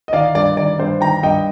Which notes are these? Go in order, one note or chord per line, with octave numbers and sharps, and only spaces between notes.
D#5
D#3 D5 F5
G2 D5
D#3 D5
G2 C5
D#3 G5 A#5
G2 D#5 G5